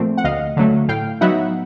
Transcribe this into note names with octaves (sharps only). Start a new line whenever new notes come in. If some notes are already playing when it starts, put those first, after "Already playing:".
Already playing: A#2 F3 A3 C4
F#5
D2 D#5 F5
D3 F#3 A3
A2 F5 G5
F#3 B3 D#4 E5 F#5